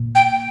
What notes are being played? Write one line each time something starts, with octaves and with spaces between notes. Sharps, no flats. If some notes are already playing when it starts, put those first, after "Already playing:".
Already playing: A#2
G5